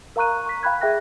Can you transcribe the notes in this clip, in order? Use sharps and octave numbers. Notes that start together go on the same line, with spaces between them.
A#4 F5 A#5 C#6 F#6 D#7
C#6 B6
F5 G5 B5 F#6 G#6
G#4 E5 G5 F#6 A#6